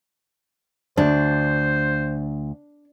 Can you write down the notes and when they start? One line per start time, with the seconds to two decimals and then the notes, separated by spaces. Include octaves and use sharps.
0.97 D2 D4 C5